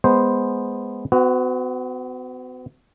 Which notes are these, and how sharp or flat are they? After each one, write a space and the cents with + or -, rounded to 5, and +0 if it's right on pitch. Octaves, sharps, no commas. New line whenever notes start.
G#3 +0 B3 +0 C5 +0
B3 +45 F#4 +0